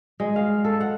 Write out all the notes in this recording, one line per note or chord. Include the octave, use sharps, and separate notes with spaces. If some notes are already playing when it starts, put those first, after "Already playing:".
G#3
F5
A4
F#5